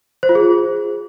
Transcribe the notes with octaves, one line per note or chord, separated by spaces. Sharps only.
C5
F4
G#4